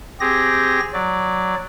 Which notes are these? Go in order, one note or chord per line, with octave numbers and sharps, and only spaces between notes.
C4 G4 G#4 A#6
F#3 D5